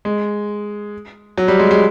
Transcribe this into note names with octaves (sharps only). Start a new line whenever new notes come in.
G#3
F#3
G3
G#3
G#3